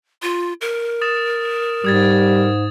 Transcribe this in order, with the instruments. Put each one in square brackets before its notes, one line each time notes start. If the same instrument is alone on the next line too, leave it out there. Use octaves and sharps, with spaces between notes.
[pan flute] F4
A#4
[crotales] D#6 A6 E7
[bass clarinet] G#2 [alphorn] G3 [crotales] D#6 G#6 A6